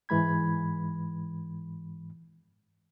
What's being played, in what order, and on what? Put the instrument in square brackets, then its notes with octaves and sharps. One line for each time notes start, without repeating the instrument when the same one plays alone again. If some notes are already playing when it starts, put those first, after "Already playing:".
[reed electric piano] G#2 E3 G#3 B5 G#6